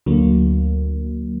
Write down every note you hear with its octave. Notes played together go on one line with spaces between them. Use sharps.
D2 D3 F#3 A#3